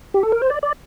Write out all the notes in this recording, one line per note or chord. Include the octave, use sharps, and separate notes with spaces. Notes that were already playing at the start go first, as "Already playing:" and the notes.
G4
A4
A#4
C5
D5
D5